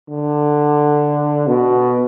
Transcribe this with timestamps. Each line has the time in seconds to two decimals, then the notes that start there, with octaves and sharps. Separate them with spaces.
0.08 D3
1.47 B2